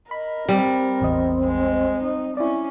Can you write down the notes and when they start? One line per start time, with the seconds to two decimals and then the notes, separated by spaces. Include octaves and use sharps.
0.11 A#4 D#5 B5
0.49 G3 C4
1.01 A1 E2 D#5
1.44 G#3
2.03 D#4
2.37 C#4 E4 D5